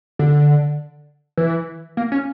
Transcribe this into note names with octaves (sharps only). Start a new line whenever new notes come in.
D3
E3
A#3
C#4